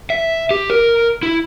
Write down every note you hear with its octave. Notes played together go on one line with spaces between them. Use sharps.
E5
G4
A#4
E4